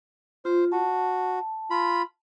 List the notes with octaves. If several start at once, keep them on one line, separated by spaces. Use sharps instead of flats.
F4 C5
F#4 A5
F4 B5